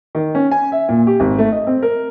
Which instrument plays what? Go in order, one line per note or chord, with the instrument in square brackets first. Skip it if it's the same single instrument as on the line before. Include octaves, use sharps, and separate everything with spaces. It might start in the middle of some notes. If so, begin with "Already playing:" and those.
[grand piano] D#3
C#4
G#5
E5
A#2
G4
G#1
A3
D#5
C4
A#4